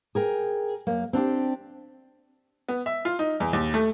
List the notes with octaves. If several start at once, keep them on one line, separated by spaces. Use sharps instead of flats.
G#4 A#4 G5
F#2 A#3
C4 D4 E4 G4
B3
E5
F4
D#4
E2
D#2
A3